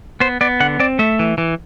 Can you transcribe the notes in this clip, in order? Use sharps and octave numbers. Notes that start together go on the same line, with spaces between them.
B3 C5
B3 D5
D3 F#5
C4 D5
A3 E5
E3
E3